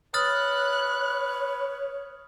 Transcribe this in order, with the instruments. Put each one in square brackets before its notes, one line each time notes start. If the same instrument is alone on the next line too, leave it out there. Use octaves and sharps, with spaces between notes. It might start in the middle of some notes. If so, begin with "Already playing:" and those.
[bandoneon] B4 [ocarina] C#5 [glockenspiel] D#6 F6 A6 [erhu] F#6